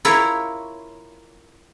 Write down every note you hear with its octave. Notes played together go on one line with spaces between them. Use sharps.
E4 F4 A#4 C#5